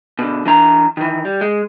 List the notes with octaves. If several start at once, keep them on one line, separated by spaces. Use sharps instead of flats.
B2 D3
E3 D4 A#5
D#3 E3
G3
G#3